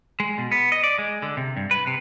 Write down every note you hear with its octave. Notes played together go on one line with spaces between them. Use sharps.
G#3
B2
B3
D#5
D5
G#3
D3
C3
G2
B4
C3